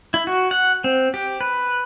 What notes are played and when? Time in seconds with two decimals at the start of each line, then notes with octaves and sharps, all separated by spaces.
0.14 E4
0.27 F#4
0.51 F#5
0.84 C4
1.14 G4
1.41 B4